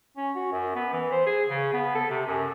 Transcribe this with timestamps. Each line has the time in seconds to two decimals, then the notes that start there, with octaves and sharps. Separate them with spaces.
0.17 C#4
0.36 F#4
0.52 F#2
0.75 B3
0.93 E3
1.12 C5
1.26 G#4
1.49 C#3
1.73 B3
1.95 A4
2.10 C3
2.27 F#2